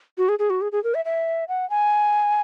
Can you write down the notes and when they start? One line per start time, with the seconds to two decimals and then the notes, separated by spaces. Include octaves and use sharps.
0.18 F#4
0.29 G#4
0.39 G#4
0.50 F#4
0.61 G#4
0.72 G#4
0.84 A#4
0.95 E5
1.05 E5
1.48 F#5
1.70 G#5